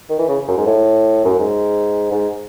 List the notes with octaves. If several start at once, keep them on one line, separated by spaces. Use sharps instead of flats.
D#3
E3
C#3
F#2
G#2
A2
F#2
G#2
G#2